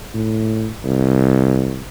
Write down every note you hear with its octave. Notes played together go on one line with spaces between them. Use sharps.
A2
C2